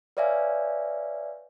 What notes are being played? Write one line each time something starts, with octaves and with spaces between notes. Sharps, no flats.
B4 C#5 D5 E5 F5 G#5